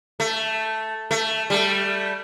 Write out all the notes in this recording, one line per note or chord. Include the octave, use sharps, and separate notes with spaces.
A3
A3
G3 A3